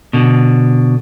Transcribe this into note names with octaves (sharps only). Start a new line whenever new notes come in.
B2 D3